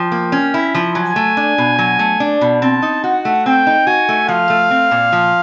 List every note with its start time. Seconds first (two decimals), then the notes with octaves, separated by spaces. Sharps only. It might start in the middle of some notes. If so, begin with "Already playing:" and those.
Already playing: F3 G5
0.12 A#3
0.32 C#4
0.54 E4
0.75 F3
0.95 F#3 G#5
1.16 A3
1.37 D4
1.58 B2
1.79 F#3
1.99 A3
2.20 D4
2.41 B2
2.62 C4 A5
2.82 D#4
3.04 F#4 F#5
3.25 A3
3.46 C4 G5
3.67 D#4
3.87 F#4 G#5
4.09 A3
4.28 F3 F5
4.50 A3
4.71 C4
4.91 A#2
5.12 F3